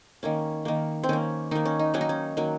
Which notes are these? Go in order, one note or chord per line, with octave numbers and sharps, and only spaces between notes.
D#3 A#3 C#4
D#3 A#3
C4
D#3 A#3 C#4
D#3 A#3 D#4
C#4
D#4
D#3 F#3 A#3 C#4
D#4
C#4
D#3 F#3 A#3